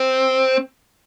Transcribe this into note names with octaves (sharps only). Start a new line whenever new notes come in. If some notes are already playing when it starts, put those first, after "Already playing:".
Already playing: C4